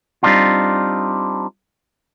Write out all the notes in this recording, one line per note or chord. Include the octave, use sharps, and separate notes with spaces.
G3 C4 D4 D#4 F4